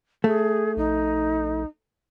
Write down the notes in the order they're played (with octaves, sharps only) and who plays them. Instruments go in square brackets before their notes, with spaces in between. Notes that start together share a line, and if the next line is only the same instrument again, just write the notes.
[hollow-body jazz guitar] A3 [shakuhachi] G#4
[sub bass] A#1 [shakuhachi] D#4